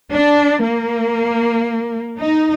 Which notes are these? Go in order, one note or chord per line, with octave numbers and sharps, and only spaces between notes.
D4
A#3
D#4